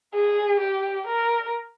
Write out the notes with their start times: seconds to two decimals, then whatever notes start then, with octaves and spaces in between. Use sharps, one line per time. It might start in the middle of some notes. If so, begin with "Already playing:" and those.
0.14 G#4
0.60 G4
1.07 A#4